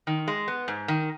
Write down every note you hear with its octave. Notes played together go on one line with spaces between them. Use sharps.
D#3
G#3
B3
G#2
D#3